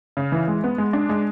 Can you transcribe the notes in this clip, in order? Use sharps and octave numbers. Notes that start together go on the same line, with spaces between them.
C#3
E3
G#3
B3
G#3
D4
G#3